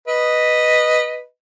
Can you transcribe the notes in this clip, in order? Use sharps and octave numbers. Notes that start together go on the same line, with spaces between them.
B4 D#5